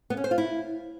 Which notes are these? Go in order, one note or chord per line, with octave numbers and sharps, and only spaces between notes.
B3
C#4
C5
F4
E4